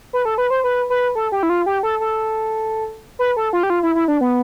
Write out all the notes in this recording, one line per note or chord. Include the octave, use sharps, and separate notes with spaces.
B4
A4
B4
C5
B4
B4
A4
G4
E4
F4
G4
A4
A4
B4
A4
F4
G4
F4
E4
E4
D4
B3